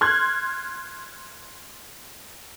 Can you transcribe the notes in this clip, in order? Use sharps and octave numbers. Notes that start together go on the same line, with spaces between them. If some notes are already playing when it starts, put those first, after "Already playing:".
C6 F6 F#6 G#6